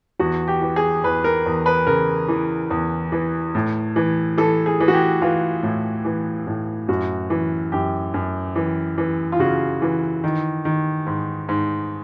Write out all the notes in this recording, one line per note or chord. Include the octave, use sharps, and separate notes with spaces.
E2 F#4
G4
E3
G#4
E2 B4
A#4
E2
B4
C#3 A#4
E3
E2
E3
A2
E3
E3 A4
G#4
E3
F#4
G4
E3 F4
A2
E3
A2
F#2 F#4
E3
F#2 G4
F#2
E3
E3
F4
C#3 F#4
E3
D#3
D#3
G#2
G#2